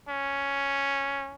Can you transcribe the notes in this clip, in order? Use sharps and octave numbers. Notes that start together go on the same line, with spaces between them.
C#4